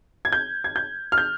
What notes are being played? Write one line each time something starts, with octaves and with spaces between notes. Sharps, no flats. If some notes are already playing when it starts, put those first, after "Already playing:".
G#6
G6
G#6
G6
F6
G6